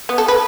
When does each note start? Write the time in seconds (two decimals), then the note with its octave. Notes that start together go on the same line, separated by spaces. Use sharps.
0.09 B3
0.18 A4
0.28 B4